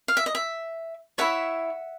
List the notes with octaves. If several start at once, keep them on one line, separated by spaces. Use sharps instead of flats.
F5
E5
D#5
E5
E4 A4 C#5 E5 F#5